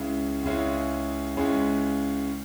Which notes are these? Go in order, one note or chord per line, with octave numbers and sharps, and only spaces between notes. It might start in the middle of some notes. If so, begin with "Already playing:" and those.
Already playing: C#2 C#3 G#3 C#4 E4
C#2 C#3 G#3 C#4 E4
C#2 C#3 G#3 C#4 E4